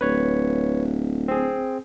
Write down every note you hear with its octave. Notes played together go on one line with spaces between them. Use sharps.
D1 B4 C#5
C4 G#4